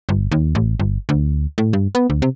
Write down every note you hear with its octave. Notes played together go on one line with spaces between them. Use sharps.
G1
D#2
A1
G1
D2
A2
G2
B3
D2
C3